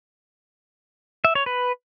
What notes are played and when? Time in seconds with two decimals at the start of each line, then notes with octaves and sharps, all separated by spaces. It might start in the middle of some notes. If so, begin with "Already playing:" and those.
1.25 E5
1.35 C#5
1.46 B4